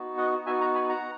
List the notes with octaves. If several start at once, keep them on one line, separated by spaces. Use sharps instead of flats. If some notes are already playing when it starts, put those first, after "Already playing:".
Already playing: B3 D#4 F#4
D#5 F#5
B3 D#4 F#4 E5 G#5
F#5 A#5
G#5 B5
F#5 A#5